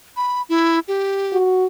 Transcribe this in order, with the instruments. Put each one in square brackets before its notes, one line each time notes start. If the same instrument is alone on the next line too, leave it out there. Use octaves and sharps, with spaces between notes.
[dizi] B5
E4
G4
[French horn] F#4